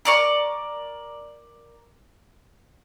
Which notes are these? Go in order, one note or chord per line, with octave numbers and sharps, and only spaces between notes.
A#4 D5 C#6